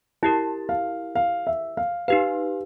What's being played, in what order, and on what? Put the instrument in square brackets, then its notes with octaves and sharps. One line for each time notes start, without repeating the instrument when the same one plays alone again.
[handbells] E4 G4 A#4 [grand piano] A5
[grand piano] F5
F5
E5
F5
[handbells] D#4 G4 B4 [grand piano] F5